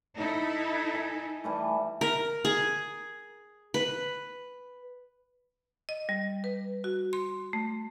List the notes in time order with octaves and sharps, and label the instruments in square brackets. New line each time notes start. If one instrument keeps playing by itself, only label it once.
[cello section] D#4 E4 A4
[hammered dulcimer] G#5
E3 G3 A3
[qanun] A#4
G#4
B4
[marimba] D#5
G3
B4
F#4
C6
A3